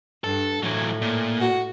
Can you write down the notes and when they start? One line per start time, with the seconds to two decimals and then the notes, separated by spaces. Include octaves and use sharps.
0.24 G2 A4
0.63 A2 E3 F#3
1.02 A#2
1.41 F#4